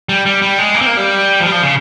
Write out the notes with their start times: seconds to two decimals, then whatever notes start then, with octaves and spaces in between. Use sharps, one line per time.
0.09 G3
0.26 G3
0.42 G3
0.58 G#3
0.74 A#3
0.81 C4
0.86 A#3
0.97 G3
1.40 F3
1.46 G3
1.52 F3
1.62 C#3